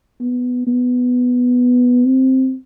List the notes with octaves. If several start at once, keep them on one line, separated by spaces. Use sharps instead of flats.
B3
B3
C4